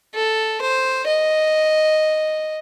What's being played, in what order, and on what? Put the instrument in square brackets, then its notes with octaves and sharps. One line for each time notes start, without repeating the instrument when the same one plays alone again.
[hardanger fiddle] A4
C5
D#5